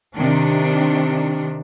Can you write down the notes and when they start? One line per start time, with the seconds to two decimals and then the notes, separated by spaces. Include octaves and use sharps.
0.15 C3 D#3 D4